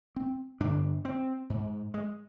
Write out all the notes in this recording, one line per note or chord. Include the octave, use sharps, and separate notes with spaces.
C4
G2 D3 D4
C4
G#2
G#3